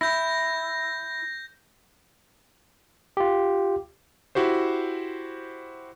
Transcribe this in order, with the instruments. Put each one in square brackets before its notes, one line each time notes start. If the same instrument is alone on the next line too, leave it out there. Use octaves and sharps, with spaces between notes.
[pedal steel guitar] E4 [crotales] G6 A#6
[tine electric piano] F4 G4
[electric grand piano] E4 F#4 G4 C5